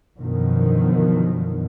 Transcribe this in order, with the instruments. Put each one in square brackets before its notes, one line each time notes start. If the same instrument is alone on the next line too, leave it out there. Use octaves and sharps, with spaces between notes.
[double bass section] F#2 B2 D3 D#3 F3